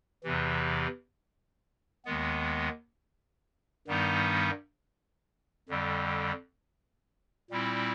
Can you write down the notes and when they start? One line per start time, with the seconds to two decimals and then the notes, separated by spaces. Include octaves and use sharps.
0.24 E2 C3 E3
2.05 D#2 D#3 G#3 B3
3.87 G2 D#3 G3 B3 D#4
5.69 F2 D3 G3
7.51 A#2 G3 C4 E4